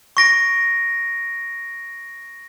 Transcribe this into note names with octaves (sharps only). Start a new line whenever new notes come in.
C#6 A#6 D7